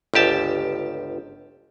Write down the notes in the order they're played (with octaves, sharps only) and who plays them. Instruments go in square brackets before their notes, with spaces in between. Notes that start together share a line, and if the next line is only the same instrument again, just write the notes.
[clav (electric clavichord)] G1 C#2 G4 A5